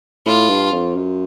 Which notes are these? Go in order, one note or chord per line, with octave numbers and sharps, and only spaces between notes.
A2 F4
G2
F2
F#2